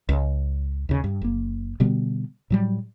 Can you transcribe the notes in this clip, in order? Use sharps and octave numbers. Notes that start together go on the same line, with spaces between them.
C#2
D#2 C#3
G2
F#1 A#3
B2 D3 G3 B3
A2 F#3 G3